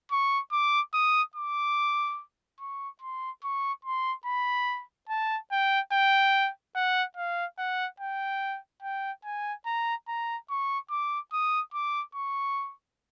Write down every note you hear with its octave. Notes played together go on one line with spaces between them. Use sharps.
C#6
D6
D#6
D6
C#6
C6
C#6
C6
B5
A5
G5
G5
F#5
F5
F#5
G5
G5
G#5
A#5
A#5
C#6
D6
D#6
D6
C#6